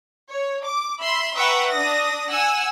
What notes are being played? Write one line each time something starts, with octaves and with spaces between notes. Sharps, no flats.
C#5
D6
E5 B5 C6
B4 E5 F#5 G5 A#5 C#6
D4 D#6 A#6
F#5 G#5 E6